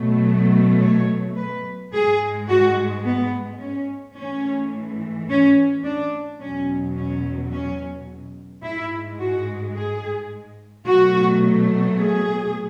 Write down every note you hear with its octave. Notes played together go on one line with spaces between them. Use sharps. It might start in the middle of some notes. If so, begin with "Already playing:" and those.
Already playing: B2 F#3 A3
C#5
B4
G#2 G#3 G#4
F#4
B3
C#4
G#2 E3 A3 C#4
C#4
D4
E2 B2 F#3 C#4
C#4
C#4
G#2 G#3 E4
F#4
G#4
B2 F#3 A3 F#4
G#4